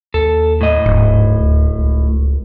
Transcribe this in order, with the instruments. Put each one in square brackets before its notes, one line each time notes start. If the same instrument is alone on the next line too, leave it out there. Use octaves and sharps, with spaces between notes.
[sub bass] D#2 [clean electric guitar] A4
[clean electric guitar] A2 D#5
[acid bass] D1 [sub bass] G#2
[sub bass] D2
C#2